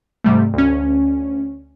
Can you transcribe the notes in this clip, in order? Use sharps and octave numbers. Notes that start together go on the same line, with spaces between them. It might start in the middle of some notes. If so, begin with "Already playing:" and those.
G#2 C3 G3 A3
D2 C#4